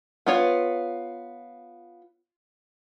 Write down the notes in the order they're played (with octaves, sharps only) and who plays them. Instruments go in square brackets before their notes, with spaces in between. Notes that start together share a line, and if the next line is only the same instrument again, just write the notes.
[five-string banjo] B3 F4 C#5